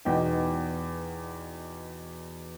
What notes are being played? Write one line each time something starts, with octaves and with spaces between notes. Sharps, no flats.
E2 B2 D#4 G5